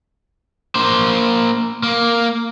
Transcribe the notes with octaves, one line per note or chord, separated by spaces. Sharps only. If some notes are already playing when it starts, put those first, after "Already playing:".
A#3 C5
A#3